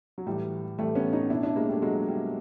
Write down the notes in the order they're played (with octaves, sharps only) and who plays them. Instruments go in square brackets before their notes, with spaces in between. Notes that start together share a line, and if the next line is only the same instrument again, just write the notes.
[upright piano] F#3
A2 E3 G3
A2 E3 G3 A3
B3 C#4
C#4 D#4
B2 D4 E4
D4 E4
G#3 A#3
G3 A3
B2 F#3 G#3
G3